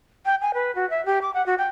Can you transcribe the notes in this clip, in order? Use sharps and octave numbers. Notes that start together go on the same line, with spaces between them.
G5
G#5
B4
F#4
E5
G4
D6
F#5
F#4
G5